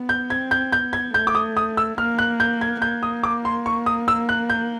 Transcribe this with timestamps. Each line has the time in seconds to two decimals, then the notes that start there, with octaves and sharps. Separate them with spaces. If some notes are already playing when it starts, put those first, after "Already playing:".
Already playing: B3
0.09 G6
0.30 C4 G#6
0.51 G6
0.72 B3 G6
0.93 G#6
1.14 A3 G6
1.27 D6
1.35 D#6
1.57 D#6
1.77 E6
1.98 A#3 F6
2.19 F#6
2.40 G6
2.61 G#6
2.82 A#3 G6
3.03 D#6
3.23 D6
3.45 C6
3.66 C#6
3.86 D#6
4.08 E6
4.29 F#6
4.50 G6